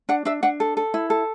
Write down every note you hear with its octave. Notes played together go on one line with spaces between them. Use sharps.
D4 F#5
D4 E5
D4 F#5
A4
A4
E4
A4